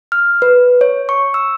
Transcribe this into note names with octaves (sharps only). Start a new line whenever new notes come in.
F6
B4
C#5
C#6
E6